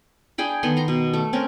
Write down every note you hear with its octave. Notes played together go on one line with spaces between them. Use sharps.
D4 G#4 G5 B5
D#3 B3 A4 C6
A#5 C6
B2
A3
C4 C#4 A#4